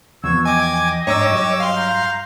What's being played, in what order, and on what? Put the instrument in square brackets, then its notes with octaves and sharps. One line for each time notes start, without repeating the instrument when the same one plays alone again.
[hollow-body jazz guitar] E2 F3 B3 [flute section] C#6 E6 G#6
[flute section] D#5 G5 [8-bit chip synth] G#5 D6 G#6
[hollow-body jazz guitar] G#2 D4 A#5 [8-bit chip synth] C#5 D6 E6
[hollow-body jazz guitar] G2 F#3
[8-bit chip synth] F5 C6
[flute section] A#5 G6